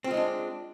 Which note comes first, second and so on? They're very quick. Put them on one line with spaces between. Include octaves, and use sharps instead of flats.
C4 F4 G#3 D#4 D4